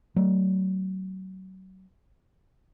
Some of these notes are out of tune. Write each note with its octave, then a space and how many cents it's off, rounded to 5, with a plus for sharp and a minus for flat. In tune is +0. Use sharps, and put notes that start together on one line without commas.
F#3 +30 A3 +25